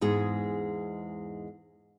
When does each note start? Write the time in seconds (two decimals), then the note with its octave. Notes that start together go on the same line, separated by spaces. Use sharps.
0.01 E2 G#2 G#3 G#4